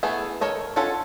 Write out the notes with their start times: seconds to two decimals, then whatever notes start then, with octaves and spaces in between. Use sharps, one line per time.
0.03 E3 A3 B3 G#4
0.41 A4 A#4 C#5 D#5
0.76 C#4 F4 A4 C#5 F#5